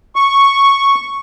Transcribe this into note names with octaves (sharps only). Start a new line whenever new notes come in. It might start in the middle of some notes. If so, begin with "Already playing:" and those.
C#6